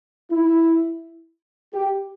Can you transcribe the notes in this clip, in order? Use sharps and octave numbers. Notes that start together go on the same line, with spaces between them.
E4
G4